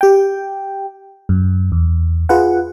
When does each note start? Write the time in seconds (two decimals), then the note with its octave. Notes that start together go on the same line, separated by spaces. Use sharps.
0.01 G4 G5
1.29 F#2
1.72 E2
2.29 F4 G#4 B4 F#5